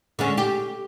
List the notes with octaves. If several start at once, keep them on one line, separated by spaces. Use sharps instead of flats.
D3 G#3 C#4
G4